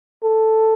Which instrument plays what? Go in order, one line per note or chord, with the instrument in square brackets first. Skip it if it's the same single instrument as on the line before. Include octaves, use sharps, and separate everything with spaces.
[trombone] A4